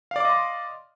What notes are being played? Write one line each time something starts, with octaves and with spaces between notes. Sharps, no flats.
D5 D#5 F5 C6 D6